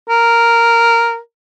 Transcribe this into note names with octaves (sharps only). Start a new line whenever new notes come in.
A#4